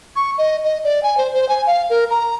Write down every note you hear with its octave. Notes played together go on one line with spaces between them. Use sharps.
C#6
D#5
D#5
D5
G#5
C5
C5
G#5
F5
A#4
A#5